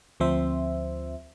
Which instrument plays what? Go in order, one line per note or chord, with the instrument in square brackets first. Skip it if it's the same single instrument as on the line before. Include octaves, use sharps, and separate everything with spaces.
[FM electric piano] D2 F3 C4 C5 E5